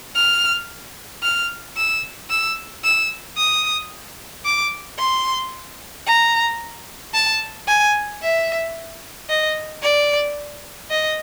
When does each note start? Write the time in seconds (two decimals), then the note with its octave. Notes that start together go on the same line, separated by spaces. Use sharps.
0.15 F6
1.23 F6
1.77 E6
2.30 E6
2.84 E6
3.37 D#6
4.45 D6
4.99 C6
6.07 A#5
7.14 A5
7.68 G#5
8.22 E5
9.30 D#5
9.83 D5
10.91 D#5